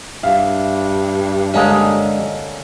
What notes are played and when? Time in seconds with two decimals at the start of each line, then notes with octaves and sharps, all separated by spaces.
0.23 G2 E5 F5
1.54 D3 G#3 A#3 C#4 D4